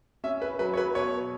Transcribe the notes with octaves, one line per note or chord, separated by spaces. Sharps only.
C#4 E5
B4
F#3 B4
C#5
B4
B2 C#5